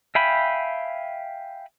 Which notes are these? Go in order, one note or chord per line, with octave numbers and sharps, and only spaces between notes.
E5 F5 G5 G#5 B5